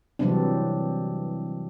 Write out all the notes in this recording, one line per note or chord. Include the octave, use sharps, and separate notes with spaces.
C3 E3 F#3 G3 C4 D4